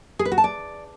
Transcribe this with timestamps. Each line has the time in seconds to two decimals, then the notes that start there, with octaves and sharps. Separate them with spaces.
0.19 G#4
0.26 B4
0.32 F#4
0.38 A5
0.44 D5